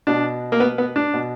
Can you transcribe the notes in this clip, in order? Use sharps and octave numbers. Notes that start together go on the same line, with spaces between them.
B2 D4
A#3
B3
B3
D4
B2